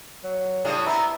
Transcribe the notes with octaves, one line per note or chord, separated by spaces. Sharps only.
F#3
A2 C#3 G3 D4
B3 C4 E4 A#5